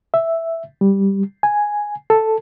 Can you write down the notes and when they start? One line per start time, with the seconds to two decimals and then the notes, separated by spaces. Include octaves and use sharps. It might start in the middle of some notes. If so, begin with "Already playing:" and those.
0.14 E5
0.81 G3
1.43 G#5
2.10 A4